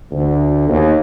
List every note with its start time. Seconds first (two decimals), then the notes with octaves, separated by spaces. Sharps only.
0.11 D2
0.68 D#2